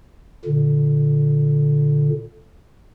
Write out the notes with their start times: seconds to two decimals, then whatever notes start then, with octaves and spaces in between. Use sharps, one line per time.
0.45 A#2 D3